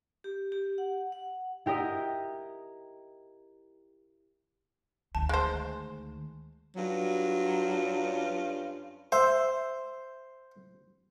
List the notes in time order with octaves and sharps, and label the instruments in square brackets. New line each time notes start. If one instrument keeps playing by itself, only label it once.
[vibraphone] G4
G4
F#5
F#5
[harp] E4 G4 A#4 D#5
[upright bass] D2 D#3 [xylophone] A5
[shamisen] G#3 C5
[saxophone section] G2 C#4 F4 [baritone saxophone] F#3
[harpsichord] C5 [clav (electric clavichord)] E5